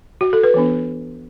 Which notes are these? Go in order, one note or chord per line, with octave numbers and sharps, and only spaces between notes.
F#4
A4
B4
E3 B3 D4